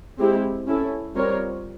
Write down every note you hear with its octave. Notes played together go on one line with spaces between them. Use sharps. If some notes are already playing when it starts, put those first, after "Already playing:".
G#3 C4 E4 G4
C#4 E4 A4
G3 C4 F4 A#4 C#5